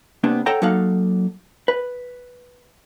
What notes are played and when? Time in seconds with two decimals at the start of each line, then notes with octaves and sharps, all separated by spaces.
0.24 C3 A#3 B3 D4
0.46 A4 C#5 F#5 G5 A5 A#5
0.62 F#3 A#3 D#4 A4 F5 F#5
1.68 B4